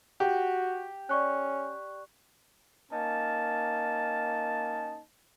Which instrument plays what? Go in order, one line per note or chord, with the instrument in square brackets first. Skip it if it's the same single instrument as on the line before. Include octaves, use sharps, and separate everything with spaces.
[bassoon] F#4 [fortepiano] G4
[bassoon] C#4 [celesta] D5 C#6 F#6
[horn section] A#3 C#4 D#4 A5